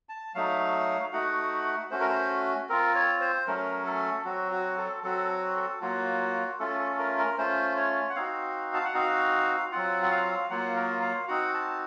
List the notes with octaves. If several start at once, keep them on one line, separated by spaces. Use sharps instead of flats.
A5
F#3 A3 D#4 F5
A3 D#4 F#4 F#5
A3 C#4 F#4 C5
A#4
C5
C4 F4 A#4
C#5
C5
F#3 A3 C#4 A#4
A4
F#3 C4 F#4
F#4
A4
F#3 C4 F#4 A4
A4
F#3 A#3 F4 F#4
A3 C#4 F4 A4
A4
A#4
A#4
A3 C#4 F4 C5
C#5
F#5
C4 D#4 F#4 F5
A5
F#5
C4 D#4 F#4 F5
F#3 C4 F4 F#5
F#5
F5
F#3 A#3 F4 F#5
A#4
F5
C4 D#4 F#4 F#5
A5